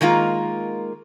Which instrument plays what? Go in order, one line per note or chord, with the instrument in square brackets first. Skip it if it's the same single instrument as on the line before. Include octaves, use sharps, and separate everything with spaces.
[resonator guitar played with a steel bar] D#3 G#3 A#3 F4